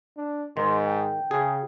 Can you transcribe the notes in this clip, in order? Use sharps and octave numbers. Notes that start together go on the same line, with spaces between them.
D4
G#2 D#3 C6
G5
C#3 G#4